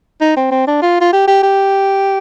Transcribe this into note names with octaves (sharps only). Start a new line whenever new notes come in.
D#4
C4
C4
D4
F4
F4
G4
G4
G4